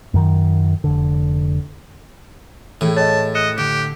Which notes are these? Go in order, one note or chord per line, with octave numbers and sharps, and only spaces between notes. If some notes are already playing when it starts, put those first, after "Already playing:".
F#2 D#3
F1 D3
A2 E3 G#4 G5
C#5 D#5 A5
D#5 F#6 C#7 E7
D3 G4